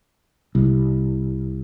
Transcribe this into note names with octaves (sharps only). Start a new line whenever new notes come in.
C2